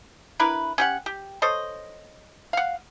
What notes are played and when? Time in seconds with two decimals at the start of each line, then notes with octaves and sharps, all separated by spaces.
0.39 D4 E4 A#4 B4
0.78 C#4 G4 F#5
1.06 G4
1.42 A4 C5 C#5 D#5
2.53 F5 F#5